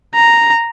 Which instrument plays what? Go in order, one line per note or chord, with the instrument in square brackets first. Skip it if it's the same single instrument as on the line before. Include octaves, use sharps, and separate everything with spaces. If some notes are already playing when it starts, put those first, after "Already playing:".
[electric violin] A#5